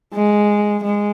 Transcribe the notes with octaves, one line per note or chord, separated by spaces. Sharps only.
G#3
G#3